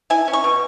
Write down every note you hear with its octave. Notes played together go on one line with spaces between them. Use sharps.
E4 G#5
C#4
C#6
B2